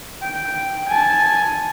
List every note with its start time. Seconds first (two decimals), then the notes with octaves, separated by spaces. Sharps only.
0.23 G5
0.89 G#5 A5